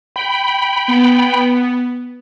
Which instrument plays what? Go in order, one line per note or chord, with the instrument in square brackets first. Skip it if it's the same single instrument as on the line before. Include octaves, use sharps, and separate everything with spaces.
[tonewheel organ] G5 B5
[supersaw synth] B3